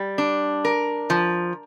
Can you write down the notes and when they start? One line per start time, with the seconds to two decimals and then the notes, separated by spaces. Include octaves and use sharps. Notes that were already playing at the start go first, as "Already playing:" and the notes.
Already playing: G3
0.18 D4
0.65 A#4
1.10 F3